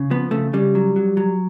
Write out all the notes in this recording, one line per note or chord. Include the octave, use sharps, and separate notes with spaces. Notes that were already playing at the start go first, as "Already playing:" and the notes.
Already playing: C#3
F3 B3
C#3 A3
C#3 G3
F#3
F#3
F#3